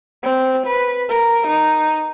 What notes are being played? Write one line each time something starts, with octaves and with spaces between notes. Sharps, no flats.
C4
B4
A#4
D#4